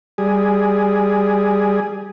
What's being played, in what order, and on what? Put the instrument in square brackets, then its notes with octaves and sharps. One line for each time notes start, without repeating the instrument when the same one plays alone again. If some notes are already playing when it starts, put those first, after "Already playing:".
[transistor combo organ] G3 G#4